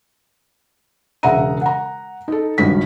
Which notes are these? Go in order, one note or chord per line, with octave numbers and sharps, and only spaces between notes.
E1 C#3 E5 F#5 A#5 D#7
F#5 A#5
D#4 A4
G#1 C#2 G2 F#3 B6